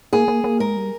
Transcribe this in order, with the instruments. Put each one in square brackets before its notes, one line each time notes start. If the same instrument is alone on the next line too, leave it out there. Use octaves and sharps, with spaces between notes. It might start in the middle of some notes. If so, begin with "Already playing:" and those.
[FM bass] A#3 [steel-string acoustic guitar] G#4
[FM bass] A#3
A#3
[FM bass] G#3 [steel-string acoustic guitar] A#4
[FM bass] G3